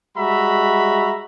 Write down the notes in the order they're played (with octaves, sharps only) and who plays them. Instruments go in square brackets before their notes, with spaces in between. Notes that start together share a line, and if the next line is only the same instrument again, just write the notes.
[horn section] G3 G#3 F#4 E5 A#5 B5